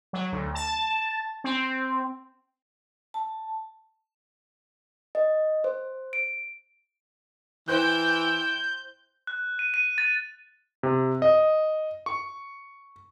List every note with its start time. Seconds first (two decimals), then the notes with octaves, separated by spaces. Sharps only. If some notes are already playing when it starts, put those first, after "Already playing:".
0.13 F#3
0.32 D2
0.55 A5
1.44 C4
3.14 A5
5.15 D#5
5.64 C5
6.13 D7
7.68 E3 E4 C5 G5 F#6 G6
9.27 F#6
9.59 D#7
9.74 D#7
9.98 A6
10.83 C3
11.22 D#5
12.06 C#6